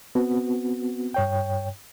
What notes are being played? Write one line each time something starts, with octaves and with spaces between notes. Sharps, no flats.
B3 C4 F#4
G2 C#5 G5